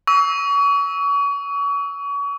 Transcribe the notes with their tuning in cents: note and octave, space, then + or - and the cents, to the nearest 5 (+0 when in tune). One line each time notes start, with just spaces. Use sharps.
C#6 +35 E6 -25